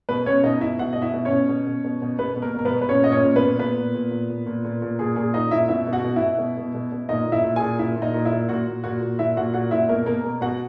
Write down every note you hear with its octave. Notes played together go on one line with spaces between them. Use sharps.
B2 B3 B4
B2 C#4 C#5
B2 D#4 D#5
B2 E4 E5
B2 F#4 F#5
B2 D#5
E4 E5
B2
C#4 C#5
B2
B2
B2
B2
B2
B2 B3 B4
B2
A#3 A#4
B2 A#4
B3 B4
B2
B4
A#2 C#4 C#5
A#2 D#5
C#4 C#5
A#2
B3 B4
A#2
A#2 B3 B4
A#2
A#2
A#2
A#2
A#2
A#2
A#2
A#2 G#4
A#2 G#4
A#2 D#4 D#5
A#2 E4 E5
B2 E4 E5
B2
F#4 F#5
B2
E4 E5
B2
B2
B2
B2
B2
A#2 D#4 D#5
A#2
E4 E5
A#2
G#4 G#5
A#2
A#2 E4 E5
A#2
D#4 D#5
A#2
E4 E5
A#2
A#2 F#4 F#5
A#2
A#2 F#4 F#5
A#2
A#2 E4 E5
A#2 F#4 F#5
A#2 F#4 F#5
A#2 E4 E5
B2 A#3 A#4
B2 A#3 A#4
B2
B2 F#4 F#5